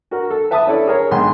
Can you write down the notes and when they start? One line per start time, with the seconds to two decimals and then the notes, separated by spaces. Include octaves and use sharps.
0.11 F#4 A#4
0.30 A4
0.51 B4 E5 A5 B5 D#6
0.67 C#4 E4 A4 D5
0.87 G#4 A#4 C#5
1.11 B1 G#2 G5 G#5 C6